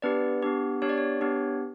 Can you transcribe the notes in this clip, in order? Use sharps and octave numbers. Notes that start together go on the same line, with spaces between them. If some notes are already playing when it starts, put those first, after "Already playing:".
B3 D4 G4 B4 D5
B3 D4 G4
B3 D4 G4 C#5
D5
C#5
B3 D4 G4